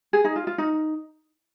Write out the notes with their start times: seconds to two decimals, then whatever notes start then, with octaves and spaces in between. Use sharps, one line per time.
0.13 G#4
0.24 D#4
0.36 F4
0.47 F4
0.58 D#4